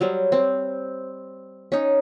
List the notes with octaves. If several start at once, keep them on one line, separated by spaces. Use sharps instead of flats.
F#3 G3 C5
C4
C#4 D#4